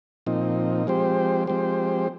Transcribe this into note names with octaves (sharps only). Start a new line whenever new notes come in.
A#2 F3 C4 D#4
F3 G#3 C4 G4 C5
F3 G#3 C4 G4 C5